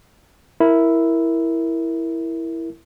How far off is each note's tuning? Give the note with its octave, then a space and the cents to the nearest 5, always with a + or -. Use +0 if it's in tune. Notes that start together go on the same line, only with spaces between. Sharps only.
E4 +0 A#4 +0